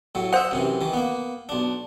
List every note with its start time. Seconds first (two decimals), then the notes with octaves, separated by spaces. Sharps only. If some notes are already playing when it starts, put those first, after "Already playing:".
0.15 A2 F#3
0.33 C5 D#5 E5 F#5
0.51 F#2 C3 E3
0.81 D#3 E3
0.93 A#3 B3
1.49 B1 D4